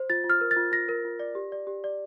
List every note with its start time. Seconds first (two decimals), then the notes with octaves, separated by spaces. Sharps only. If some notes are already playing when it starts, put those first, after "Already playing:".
Already playing: C5
0.10 F4 A6
0.24 F4
0.30 F6
0.41 A#4
0.51 A6
0.56 F4
0.72 F4 A#6
0.89 A#4
1.05 F4
1.20 D5
1.35 G4
1.52 D5
1.67 G4
1.84 D5